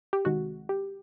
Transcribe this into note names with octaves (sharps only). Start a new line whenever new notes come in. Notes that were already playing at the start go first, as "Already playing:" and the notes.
G4
C2 C3 D#3 G#3 F#4
G4